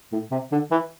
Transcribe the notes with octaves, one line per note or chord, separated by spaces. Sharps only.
A2
C3
D3
E3